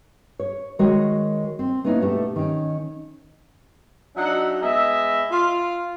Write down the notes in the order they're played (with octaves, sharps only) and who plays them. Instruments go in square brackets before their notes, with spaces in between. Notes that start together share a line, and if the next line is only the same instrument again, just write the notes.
[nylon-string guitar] C#5
D#3 G#3 F#4 A#4 C#5
C4
A#3 B3 C#4 D#4 E4
B2 A3 G4 A5
D#3 C#4
[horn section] F#3 D4 D#4 E5 F#5
G#3 B3 D#5 E5
F4